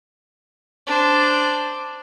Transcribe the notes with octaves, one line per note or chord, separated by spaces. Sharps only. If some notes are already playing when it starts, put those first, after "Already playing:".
D4 C5